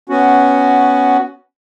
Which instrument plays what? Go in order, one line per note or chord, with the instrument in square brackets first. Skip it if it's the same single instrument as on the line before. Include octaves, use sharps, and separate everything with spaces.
[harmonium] B3 C#4 F#4